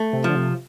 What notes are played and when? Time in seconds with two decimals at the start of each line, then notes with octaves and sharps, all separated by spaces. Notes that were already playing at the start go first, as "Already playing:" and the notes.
Already playing: A3
0.13 C3
0.24 F3
0.29 D3
0.35 C3